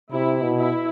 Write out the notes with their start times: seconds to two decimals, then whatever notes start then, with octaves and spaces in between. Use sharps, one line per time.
0.12 C3 E4
0.43 B2
0.58 E4